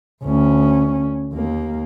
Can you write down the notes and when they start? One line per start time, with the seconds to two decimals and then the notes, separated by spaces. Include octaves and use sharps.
0.24 D2 C#4
1.34 D#2 A#3